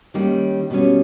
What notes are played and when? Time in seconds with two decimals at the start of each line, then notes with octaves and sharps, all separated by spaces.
0.14 D#3 G3 A#3 C#4
0.70 B2 G3 C#4